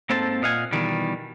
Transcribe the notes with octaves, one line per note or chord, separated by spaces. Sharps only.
G#2 A#3 C4 A4 C5 A5
A#2 D#5 F5 F#5 G#5
B2 D#3 E3 G3